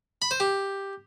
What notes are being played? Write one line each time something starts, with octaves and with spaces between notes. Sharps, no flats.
B5
C5
G4